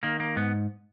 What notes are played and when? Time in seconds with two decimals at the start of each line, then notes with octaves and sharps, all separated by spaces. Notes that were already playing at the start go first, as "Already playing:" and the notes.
0.03 D#3 A#3
0.20 A#3
0.36 G#2 B3